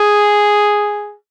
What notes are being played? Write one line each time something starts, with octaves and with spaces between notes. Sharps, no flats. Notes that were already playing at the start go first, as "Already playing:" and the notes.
Already playing: G#4